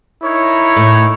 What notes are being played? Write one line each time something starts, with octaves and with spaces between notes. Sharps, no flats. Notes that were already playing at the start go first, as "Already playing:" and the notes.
D#4 E4 A#4 C#5
A2